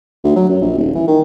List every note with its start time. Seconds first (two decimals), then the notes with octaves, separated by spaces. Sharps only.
0.24 D2
0.36 F#3
0.49 F#2
0.61 A#1
0.77 D#1
0.95 E3
1.08 D#3